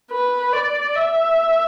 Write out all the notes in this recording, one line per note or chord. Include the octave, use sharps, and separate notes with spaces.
B4
D5
E5